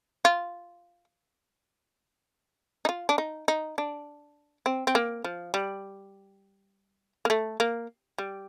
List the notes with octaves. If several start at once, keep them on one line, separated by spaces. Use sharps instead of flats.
F4
D#4
F4
D4
D#4
D#4
D4
C4
C4
A#3
F3
G3
A#3
A3
A#3
G3